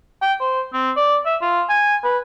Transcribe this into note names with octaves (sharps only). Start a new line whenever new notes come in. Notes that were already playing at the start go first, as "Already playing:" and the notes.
G5
C5
C4
D5
E5
F4
G#5
B4